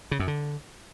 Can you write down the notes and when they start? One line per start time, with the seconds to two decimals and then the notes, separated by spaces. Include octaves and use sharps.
0.11 C#3
0.19 F#2
0.28 D3